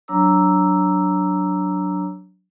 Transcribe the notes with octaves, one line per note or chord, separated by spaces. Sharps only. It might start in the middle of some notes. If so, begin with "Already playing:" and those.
F#3 D4 C#5 A#5 D6 E6